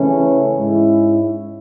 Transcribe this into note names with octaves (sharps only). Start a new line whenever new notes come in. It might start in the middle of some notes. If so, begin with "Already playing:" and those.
Already playing: C#3 E3 A3 C#4 E4
G#2 G#3 C#4 E4